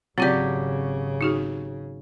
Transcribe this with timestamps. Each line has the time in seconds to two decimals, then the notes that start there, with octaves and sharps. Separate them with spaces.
0.18 G#1 C#3 F#3 C4 F4 G4 D5
1.21 D#4 F#4 G#4